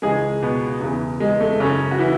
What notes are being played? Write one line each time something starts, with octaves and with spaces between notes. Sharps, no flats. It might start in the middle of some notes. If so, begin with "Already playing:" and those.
C#2 C#3 E3 G#3 G#4
B2 B3
E2 C#3 E3
G#3
A3
F#2 C#3 E3 C#4
F#4
E3 E4